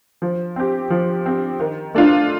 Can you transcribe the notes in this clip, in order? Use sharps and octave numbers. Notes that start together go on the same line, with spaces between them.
F3
C4 G4
F3
C4 G4
D#3
A3 D4 F4